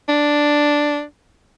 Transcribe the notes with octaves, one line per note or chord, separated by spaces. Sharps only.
D4